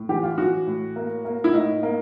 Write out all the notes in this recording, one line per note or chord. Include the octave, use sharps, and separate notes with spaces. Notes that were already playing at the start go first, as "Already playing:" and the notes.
Already playing: A2
E3 G4
F4
E3 F#4
A2
A#3
A#3
E4
A2 D#4
A#3